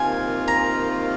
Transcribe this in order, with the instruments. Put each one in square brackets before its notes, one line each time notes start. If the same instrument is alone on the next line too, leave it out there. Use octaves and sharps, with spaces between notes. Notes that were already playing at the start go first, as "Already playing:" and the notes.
Already playing: [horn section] C3 D#3 A#3 F4 [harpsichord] G#5
[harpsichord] A#5